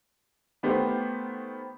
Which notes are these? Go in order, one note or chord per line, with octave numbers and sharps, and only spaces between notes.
D#3 A3 B3 G4 C5